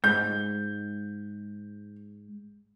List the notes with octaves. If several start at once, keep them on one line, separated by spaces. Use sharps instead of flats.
G#2 G6